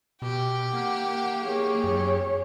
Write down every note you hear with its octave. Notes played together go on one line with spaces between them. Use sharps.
B2 G4
A#3 F#5
G#4 C#5
F#2